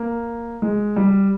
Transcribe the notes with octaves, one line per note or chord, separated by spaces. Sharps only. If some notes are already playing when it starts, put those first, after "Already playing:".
Already playing: A#3
G#3
G3